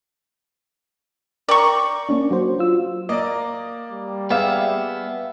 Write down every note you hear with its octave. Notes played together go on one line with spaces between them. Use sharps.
A#4 D5 G5 A#5 C#6
A#3 C#4 D4
F#3 F#4 C5
F4 E6
A#3 D5 D#5
G3
B3 G4 G#4 E5 F5